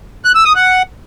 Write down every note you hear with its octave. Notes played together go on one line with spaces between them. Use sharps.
F#6
E6
D#6
F#5